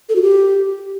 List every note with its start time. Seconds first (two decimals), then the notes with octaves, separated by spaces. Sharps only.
0.09 A4
0.15 F#4
0.22 G4